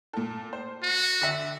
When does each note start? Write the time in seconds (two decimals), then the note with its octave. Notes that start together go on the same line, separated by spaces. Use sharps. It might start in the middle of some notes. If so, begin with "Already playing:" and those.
0.13 A#2 A4
0.53 C5
0.83 F#4
1.21 D3 E5